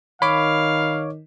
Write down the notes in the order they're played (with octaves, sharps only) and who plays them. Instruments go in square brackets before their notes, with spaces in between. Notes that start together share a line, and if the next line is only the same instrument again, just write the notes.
[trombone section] D#3 [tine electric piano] C#5 D6 [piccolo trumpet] F5 [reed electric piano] B5